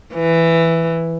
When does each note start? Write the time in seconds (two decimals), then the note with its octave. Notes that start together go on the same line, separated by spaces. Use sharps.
0.14 E3